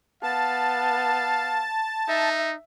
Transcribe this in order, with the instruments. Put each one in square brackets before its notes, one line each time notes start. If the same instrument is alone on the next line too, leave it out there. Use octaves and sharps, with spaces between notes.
[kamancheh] B3 [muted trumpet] F5 [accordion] A5
[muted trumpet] D#4 [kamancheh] E5